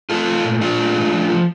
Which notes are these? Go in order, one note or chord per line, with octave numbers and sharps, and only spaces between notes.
A3 F4 A4
A3
A#2
A#2 D4 F4
A3
A3
F3
F3